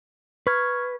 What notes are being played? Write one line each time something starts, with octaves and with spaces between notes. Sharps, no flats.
B4 C#6 F6 G#6